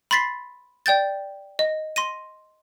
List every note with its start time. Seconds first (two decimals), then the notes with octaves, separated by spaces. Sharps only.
0.11 B5 C6 A6 B6 C7
0.86 D5 G5 G6 A6
1.59 D#5
1.96 C6 A#6 D#7